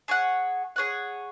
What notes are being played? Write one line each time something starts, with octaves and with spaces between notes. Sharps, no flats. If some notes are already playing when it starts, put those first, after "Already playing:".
G#4 C#5 F#5
G#4 C#5 F#5